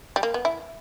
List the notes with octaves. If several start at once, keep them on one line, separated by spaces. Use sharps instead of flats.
G3
A#3
B3
E4